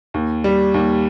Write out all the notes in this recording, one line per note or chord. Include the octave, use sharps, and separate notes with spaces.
D#2
G3
D#2